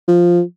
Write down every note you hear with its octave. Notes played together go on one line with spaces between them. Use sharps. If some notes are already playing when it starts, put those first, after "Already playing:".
F3